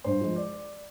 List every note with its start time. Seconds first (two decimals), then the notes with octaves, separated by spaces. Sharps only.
0.04 G2 C5
0.21 F3 G#3
0.36 D5